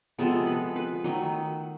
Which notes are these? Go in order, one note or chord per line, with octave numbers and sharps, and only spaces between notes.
C3 F3 G#3 B3 A4
B4
B4
D#3 F#3 A3